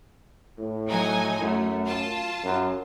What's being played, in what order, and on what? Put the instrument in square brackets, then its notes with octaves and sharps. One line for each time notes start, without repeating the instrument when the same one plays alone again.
[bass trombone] A2
[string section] F#3 D#4 G#5
[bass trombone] F#2 [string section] A3
[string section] F4 A5
[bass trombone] F#2